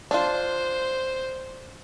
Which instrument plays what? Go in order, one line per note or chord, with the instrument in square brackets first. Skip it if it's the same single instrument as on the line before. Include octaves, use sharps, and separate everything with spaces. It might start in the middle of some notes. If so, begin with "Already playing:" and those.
[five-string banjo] D4 F4 [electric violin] C5